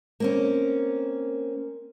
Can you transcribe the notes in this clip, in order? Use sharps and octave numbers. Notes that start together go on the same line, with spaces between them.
A#3 C4 C#4